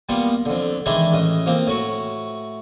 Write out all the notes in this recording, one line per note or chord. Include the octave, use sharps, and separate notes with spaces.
G3 A#3 B3 F4
F2 D3
D#3 E3 G#3 D4 E4
A1 D#5
F3 A#3 C4
A2 F#4